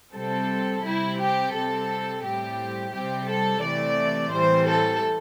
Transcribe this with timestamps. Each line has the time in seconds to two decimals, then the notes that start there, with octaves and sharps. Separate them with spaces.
0.14 C3 G3 C4 A4
0.84 C3 G3 C4 E4
1.19 G4
1.54 C3 G3 C4 A4
2.23 A2 G3 C4 G4
2.92 C3 G3 C4 G4
3.28 A4
3.63 C3 E3 A3 D5
4.32 A2 E3 G3 C4 C5
4.67 A4